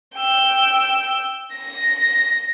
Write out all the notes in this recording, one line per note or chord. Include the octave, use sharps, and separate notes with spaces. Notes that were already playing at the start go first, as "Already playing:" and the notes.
G5 E6
A#6